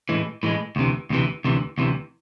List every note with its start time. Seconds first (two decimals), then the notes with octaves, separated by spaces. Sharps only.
0.09 A2 E3 G#3
0.43 A2 E3 G#3
0.76 D2 C3 E3
1.10 D2 C3 E3
1.45 D2 C3 E3
1.78 D2 C3 E3